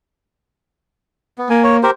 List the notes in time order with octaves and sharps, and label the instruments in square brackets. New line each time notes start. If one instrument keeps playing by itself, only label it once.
[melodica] B3
[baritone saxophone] A#3 [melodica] G#5
[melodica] C#5
G4 A#4 C5